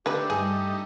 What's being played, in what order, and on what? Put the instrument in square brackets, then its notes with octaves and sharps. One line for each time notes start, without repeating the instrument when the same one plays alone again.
[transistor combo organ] D3 A3 [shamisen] D#3 B4 [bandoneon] G4
[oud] G2 [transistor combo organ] A3 D#4 [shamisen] G#4